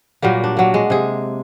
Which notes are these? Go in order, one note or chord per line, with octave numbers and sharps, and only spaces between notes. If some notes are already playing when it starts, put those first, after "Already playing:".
A#2 F#3 G3 A#3
D4
F#3 A#3
G#3
C3 G#4